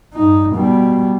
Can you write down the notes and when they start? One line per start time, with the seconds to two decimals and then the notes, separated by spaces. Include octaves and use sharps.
0.14 G2 D#4
0.55 B2 G3